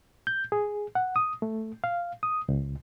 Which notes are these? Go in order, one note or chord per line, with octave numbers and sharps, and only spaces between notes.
G6
G#4
F#5
D#6
A3
F5
D#6
C#2